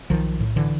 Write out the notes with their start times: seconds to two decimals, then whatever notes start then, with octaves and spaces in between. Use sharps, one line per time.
0.10 B1 D#3 F3
0.40 A2
0.56 D3 E3